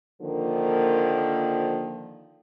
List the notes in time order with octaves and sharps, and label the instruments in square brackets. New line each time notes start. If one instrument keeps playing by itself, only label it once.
[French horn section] D3 D#3 F3 A#3